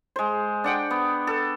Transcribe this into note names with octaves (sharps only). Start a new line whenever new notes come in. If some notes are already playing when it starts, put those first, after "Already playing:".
G#3 C5
D4 F#5 G5
B3
A4